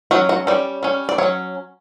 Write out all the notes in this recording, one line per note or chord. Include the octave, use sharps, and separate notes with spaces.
F#3 C#4 F#4
F#4
G3 C#4 D5
G3 C#4
D5
F#3 C#4 C#5